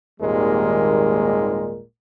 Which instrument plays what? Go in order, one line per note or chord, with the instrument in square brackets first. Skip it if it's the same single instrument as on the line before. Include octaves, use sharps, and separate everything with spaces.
[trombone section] G#1 D#2 A#2 G3 G#3 A#4